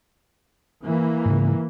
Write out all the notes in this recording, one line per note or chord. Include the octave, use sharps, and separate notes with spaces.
E3 A#3
G#2 C#3